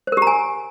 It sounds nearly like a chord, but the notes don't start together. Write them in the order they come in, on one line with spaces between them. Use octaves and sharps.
C5 A#4 G4 A#5 G#5